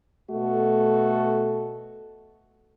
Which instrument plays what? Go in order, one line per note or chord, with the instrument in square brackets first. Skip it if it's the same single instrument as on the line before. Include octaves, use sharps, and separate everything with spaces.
[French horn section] B2 A3 F#4 A4